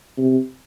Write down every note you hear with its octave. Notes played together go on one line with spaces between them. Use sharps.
C3